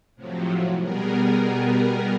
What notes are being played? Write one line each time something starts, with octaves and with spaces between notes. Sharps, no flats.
A2 C3 F3 F#3
B2 G3 B3 G#4 A#4